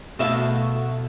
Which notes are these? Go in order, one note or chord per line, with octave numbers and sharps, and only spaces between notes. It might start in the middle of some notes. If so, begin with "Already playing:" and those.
B2 A3 F#4 E5 F5